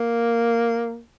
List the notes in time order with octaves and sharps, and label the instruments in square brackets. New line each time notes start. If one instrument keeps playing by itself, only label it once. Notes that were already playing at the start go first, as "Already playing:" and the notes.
Already playing: [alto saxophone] A#3